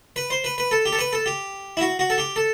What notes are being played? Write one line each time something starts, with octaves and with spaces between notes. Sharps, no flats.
B4
C5
B4
B4
A4
G4
A4
B4
A4
G4
E4
F#4
F#4
A4
G4
A4